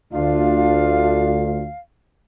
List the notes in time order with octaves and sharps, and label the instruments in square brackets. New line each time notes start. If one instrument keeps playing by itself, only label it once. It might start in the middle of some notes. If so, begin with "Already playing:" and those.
[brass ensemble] D2 [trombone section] A3 D4 F4 [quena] F5